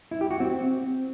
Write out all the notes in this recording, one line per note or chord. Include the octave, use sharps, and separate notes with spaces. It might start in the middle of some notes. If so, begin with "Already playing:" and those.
E4
G4
F#4
C4